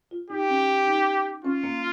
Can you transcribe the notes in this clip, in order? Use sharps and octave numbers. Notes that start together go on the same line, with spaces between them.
F4
D#4 G4
C#4
D#4
C#4 F4
A#3